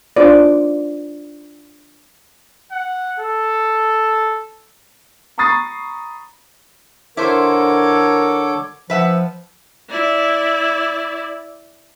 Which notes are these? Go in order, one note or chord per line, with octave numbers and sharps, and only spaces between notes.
D4 D#4 F4 C5 D5
F#5
A4
A#5 B5 C#6 D#6 A6 C7
D3 E4 A4 A#4 C5 C#5 D6
F3 B4 E5 F#5
E4 D5